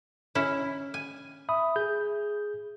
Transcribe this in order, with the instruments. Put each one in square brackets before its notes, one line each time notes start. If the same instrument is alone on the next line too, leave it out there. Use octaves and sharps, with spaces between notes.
[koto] C#4 E4
G#5
[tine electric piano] E5 B5 D#6
G#4 G6